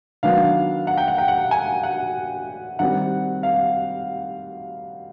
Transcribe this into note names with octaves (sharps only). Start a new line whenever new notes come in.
D#3 F#3 B3 D4 F5
F#5
G5
F#5
G5
F#5
G#5
F#5
D#3 G3 C4 F#5
F5